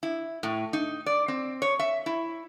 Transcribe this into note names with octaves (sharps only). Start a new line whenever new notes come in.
E4
A2
D#4
D5
C4
C#5
E5
E4